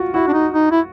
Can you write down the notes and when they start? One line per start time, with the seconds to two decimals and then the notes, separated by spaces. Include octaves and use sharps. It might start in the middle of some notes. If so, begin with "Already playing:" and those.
Already playing: F4 F#4
0.14 E4 F#4
0.28 D4
0.33 D#4
0.54 D#4
0.71 E4